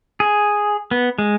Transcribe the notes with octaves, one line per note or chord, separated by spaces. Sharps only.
G#4
B3
G#3